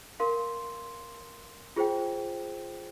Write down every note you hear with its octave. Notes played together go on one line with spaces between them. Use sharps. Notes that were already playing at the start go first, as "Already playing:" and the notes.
A#4 F5 C6
F4 G#4 C5 G5